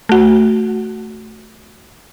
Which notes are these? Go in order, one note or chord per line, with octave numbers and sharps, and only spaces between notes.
A3 F#4